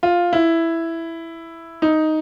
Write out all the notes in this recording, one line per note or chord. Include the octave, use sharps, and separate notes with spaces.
F4
E4
D#4